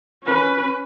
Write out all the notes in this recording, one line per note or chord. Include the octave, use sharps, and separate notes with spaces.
C#4 B4